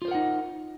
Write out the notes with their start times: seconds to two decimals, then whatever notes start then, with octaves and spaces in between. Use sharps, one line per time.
0.02 F4
0.05 C5
0.08 A#4
0.11 F#5
0.15 D#4